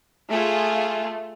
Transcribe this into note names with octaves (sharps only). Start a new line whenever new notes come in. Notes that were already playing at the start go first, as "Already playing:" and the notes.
A3 F4 G#4